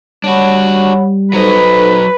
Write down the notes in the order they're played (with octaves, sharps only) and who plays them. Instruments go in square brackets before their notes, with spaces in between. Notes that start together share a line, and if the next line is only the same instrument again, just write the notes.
[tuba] G3 [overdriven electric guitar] D4 F#4 [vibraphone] C#5 F#5 B5
[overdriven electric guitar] F#3 D#5 [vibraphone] D#4 A4 C5 [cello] B4